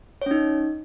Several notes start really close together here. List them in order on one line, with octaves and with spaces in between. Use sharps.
C#5 C#4 D#4